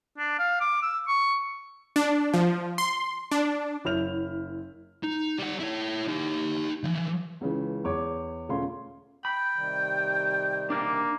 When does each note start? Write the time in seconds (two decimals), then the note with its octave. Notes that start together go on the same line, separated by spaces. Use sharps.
0.18 D4
0.39 F5
0.60 D6
0.82 E6
1.08 C#6
1.96 D4
2.34 F3
2.78 C6
3.32 D4
3.85 F#1 E4 C#5 F6 G6 F7
5.04 D#4
5.39 G3 F#5
5.60 E4 C#5
6.08 D#4 G4
6.84 E3 F3
7.41 C#2 C#3 E3
7.84 E2 C#5 D6
8.49 E1 A3 C#4 F4 F5 C6
9.25 G5 B5
9.55 C3 D#3 G3
10.70 A#3 D4 A#4